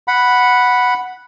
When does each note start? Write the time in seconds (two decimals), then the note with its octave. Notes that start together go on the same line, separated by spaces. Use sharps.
0.08 F#5 B5